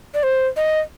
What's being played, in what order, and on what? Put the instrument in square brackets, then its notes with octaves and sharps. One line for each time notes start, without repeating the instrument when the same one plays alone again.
[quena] D5
C5
D#5